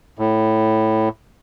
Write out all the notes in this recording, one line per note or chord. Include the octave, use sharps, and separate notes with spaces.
A2